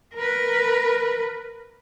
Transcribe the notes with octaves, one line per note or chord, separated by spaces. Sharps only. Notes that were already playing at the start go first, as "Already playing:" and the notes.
A#4 B4